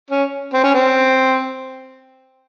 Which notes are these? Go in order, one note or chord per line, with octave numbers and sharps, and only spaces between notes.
C#4
C4
C#4
C4